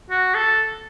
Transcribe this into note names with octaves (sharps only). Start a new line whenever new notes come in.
F#4
A4